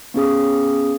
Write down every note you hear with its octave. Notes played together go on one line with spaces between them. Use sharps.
B3 C#4 G#4 D#6